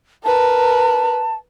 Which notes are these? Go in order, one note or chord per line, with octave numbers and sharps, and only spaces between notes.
A#4 B4 A5